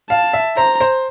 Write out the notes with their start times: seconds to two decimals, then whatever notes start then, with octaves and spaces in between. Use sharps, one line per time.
0.10 F5 A5
0.33 E5
0.57 C5 A#5
0.80 C5